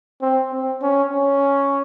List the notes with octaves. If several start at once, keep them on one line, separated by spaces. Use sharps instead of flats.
C4
C4
C#4
C#4